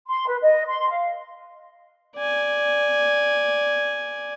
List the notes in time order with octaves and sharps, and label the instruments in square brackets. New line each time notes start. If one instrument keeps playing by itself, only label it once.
[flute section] C6
B4
D#5
C6
F5
[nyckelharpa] D5 G#5